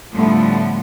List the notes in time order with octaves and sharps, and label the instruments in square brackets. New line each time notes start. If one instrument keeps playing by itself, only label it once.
[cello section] A2 D3 F3 G3 A3 B3